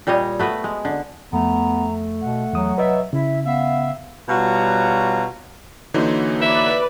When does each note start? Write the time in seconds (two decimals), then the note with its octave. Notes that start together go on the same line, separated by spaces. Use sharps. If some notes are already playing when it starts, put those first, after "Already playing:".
0.07 A#2 G3 C#5 D#5
0.39 A3 B3 F#4 B4
0.64 G#3
0.85 D3
1.33 F2 A3 B3 A#5
2.21 B2 F#5
2.53 E2 F#3 D#6
2.78 B4 D#5 E5
3.13 C#3 E4 E5
3.45 B3 E5 F5
4.29 B2 G3 F4 F#4 C#5 A#5
5.94 D3 E3 A#3 D#4 F#4 C#5
6.42 B4 D5 E5